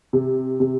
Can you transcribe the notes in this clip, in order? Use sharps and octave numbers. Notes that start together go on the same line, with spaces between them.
C3
C3